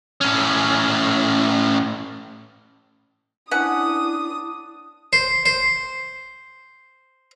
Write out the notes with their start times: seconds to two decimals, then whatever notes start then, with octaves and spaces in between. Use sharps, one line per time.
0.21 A2 C#4
3.51 C#4 D4 E4 F#5 D#6
5.13 C5
5.46 C5